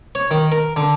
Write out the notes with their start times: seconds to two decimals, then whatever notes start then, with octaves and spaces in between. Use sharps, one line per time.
0.15 C#5
0.31 D#3
0.52 A#4
0.76 D3